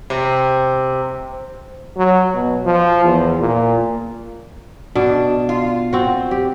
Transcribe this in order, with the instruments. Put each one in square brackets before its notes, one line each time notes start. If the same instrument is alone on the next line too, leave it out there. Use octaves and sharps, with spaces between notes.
[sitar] C3
[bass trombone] F#3
B2
F3
E2
A#2
[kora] B2 [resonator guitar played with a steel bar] D4
[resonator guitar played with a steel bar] F4
[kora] C4 F#4
G4